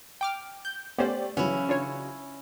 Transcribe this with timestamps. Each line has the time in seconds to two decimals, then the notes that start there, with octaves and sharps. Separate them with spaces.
0.21 G5 D6 F6
0.65 G6
0.98 A3 B3 C#4 G4 C5 D5
1.37 C#3 E3 F#3 B3 C#4 E4
1.69 D4 F4 C#5